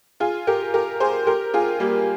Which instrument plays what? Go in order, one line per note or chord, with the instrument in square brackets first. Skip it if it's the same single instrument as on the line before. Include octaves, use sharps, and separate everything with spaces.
[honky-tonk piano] F4 G#4
G4 A#4
G4 A#4
G#4 C5
G4 A#4
F4 G#4
G3 A#3